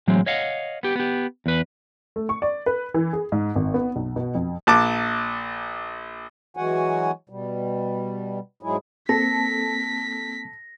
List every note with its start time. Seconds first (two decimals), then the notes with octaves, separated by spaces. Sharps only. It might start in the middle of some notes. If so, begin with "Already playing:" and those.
0.08 A2 E3 F#3 G#3 C4
0.26 C#5 D#5 F5 F#5
0.83 B3 G4
0.95 B3 G4
1.46 E2 B4
2.16 A3
2.29 C#6
2.42 D5
2.66 B4
2.94 E3
3.13 G#4
3.32 G#2
3.56 G#1
3.74 B3
3.96 B1
4.16 B2
4.35 F2
4.67 A#1 A5 D6
6.57 E3 F#3 G#3 F#4 F#5 G#5
7.29 B2 G3
8.63 G#2 F#3 G#3 E4 G#4
9.09 A#3 C4 A4 A#6 B6